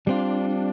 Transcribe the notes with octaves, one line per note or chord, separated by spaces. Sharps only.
G3 C4 D4 F4